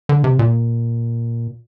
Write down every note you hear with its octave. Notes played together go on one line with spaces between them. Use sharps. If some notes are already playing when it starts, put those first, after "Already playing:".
D3
C3
A#2